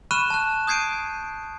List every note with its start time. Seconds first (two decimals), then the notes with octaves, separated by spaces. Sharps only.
0.11 B5 C#6 F6 F#6 D#7 E7
0.30 A5 F#6
0.67 D#6 G6 G#6 C7 D7 D#7